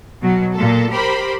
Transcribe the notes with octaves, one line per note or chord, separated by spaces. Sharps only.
B2 F#3
A#2 A4
G4 A#4 C5 B5